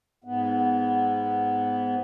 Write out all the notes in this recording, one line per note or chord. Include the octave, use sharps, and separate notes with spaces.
G#2 B3